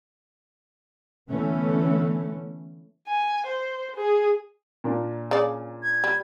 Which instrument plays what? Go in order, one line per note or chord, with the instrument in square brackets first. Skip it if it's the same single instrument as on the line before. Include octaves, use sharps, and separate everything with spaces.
[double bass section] D3 E3 A3 B3 C#4
[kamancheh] G#5
C5
G#4
[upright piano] A#2 A#3 D4
[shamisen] C#3 D5
[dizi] G#6
[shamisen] G3